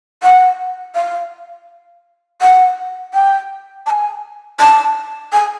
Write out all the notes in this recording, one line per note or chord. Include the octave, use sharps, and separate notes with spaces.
F#5
F5
F#5
G5
A5
G#5
A5
G#5